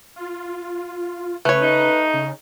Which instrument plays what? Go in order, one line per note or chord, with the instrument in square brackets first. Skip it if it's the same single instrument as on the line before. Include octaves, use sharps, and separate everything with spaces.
[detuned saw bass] F4
[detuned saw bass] C#3 [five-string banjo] A3 C#5 [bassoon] B4
[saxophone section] D#4
[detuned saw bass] C#3